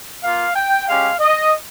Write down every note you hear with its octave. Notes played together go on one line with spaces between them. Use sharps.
A#3 F4 F5
G5
G#3 C#4 G4 F5
D#5